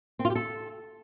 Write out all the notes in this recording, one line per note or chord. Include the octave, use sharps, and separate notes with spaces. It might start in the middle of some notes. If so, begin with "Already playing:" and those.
C4
F4
G4
A4